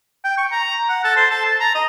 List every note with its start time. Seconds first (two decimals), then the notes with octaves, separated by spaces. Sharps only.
0.24 G5
0.38 C#6
0.52 A#5
0.89 F#5
1.04 A4
1.17 C5
1.30 A4
1.45 A5
1.60 A#5
1.75 D#5